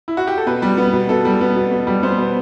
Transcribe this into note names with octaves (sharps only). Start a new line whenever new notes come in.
E4
F#4
G4
A4
B2 B4
G3
B3
B2
B2 A4
G3
B3
B2
B2
G3
B3 C5
B2